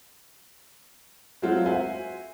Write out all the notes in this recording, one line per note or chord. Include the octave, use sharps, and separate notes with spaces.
F#3 G#3 A3 C4 F4 F#4
F#4 C5 E5 G#5